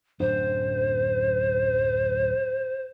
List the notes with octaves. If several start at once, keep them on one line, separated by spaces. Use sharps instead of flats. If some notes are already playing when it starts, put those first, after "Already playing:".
D1 F#2 D4 C5